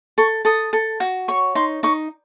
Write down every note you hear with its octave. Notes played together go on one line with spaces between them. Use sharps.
A4 C#6
A4 D#6
A4
F#4
C#5 C#6
D#4 C6
D#4 C#6